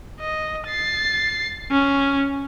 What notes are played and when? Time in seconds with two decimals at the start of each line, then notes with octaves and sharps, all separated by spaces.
0.20 D#5
0.68 A6 C7
1.71 C#4